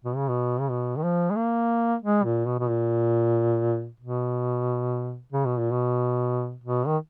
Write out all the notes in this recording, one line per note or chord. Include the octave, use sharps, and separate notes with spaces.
B2
C#3
B2
C#3
B2
D#3
F3
G#3
A#3
G#3
A#2
B2
B2
A#2
B2
C#3
B2
A#2
B2
B2
D#3